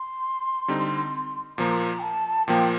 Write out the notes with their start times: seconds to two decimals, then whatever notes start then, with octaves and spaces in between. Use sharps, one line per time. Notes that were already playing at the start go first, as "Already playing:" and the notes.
Already playing: C6
0.68 D3 G3 C4 D#4
1.58 A#2 F3 A#3 A#5
1.99 G5
2.03 A5
2.48 A#2 F3 A#3 G5